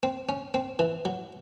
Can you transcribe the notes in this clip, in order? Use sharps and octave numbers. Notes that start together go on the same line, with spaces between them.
C4
C#4
C4
E3
F#3